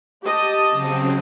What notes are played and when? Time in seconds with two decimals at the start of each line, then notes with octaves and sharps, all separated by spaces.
0.24 G4 D#5 A5
0.71 C#3 F#3 C4